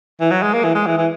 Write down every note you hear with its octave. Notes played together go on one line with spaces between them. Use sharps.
E3
F#3
G#3
A#3
E3
G#3
E3
E3